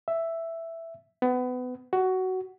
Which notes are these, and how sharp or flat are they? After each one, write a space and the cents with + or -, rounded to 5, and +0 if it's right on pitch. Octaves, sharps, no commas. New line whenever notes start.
E5 +5
B3 +25
F#4 +15